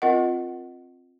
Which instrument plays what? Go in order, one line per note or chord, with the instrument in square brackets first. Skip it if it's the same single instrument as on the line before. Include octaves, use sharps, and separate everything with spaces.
[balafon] C4 F4 A#4 D#5 F#5